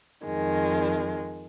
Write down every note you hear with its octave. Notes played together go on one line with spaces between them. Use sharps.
F2 D#3 G#3